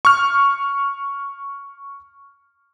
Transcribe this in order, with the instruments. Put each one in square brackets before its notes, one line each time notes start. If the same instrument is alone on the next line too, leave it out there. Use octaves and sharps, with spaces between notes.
[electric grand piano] C#6 F6